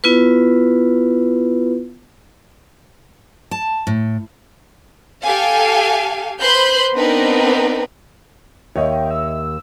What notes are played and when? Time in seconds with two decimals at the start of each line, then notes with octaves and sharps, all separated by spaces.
0.04 B3 E4 F4 B4
3.51 A5
3.87 A2
5.23 G4 A4 F5 G#5
6.41 B4 C5 B5 C6 F#6 G6
6.95 B3 C4 D4 D#4 A#4 B4
8.76 D#2 C#5 D#5 E5 G5
9.11 E6